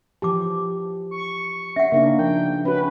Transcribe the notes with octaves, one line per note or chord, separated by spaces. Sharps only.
E3 F3 G4 A5 D6
C#6
C#4 E5 F#5
C#3 A#3 D4 D#4
F3 G5
C#4 F#4 B4